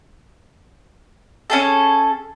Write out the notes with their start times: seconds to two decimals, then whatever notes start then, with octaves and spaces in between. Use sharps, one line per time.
1.50 C#4 G#4 A4